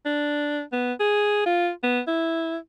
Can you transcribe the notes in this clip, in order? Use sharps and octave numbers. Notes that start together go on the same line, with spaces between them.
D4
B3
G#4
F4
B3
E4